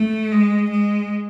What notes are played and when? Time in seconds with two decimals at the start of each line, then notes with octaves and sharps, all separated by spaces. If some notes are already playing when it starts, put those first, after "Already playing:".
Already playing: A3
0.32 G#3
0.70 G#3